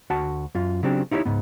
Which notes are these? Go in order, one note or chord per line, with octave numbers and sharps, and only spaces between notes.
D2 F#4 F#5 A5
F#2 F4
C#3 F#3 C4 D4 G4
D#4 E4 G4 A4 C#5
C#2 G#2 B3